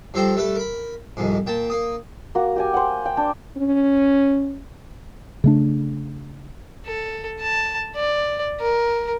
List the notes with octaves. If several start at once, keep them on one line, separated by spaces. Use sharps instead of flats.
G2 F3 A4 C5 G5 A#5
G3 A3 A4 B4
A#4 B5
C2 F2 G#2
A#2 G5 A5
A#3 D#6
A#3 F#4
G4 G5 G#5
C5 F#5
G5
D4 G5 D6
C#4
C#3 A3 D4
A4
A5
D5
A#4